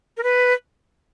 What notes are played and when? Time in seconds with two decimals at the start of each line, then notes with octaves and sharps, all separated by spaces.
0.17 A#4
0.23 B4